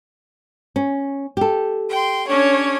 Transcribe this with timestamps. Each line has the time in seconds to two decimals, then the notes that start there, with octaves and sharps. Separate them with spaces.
0.76 C#4
1.37 G4 A4
1.90 G5 C6
2.27 C#4 D4 C#5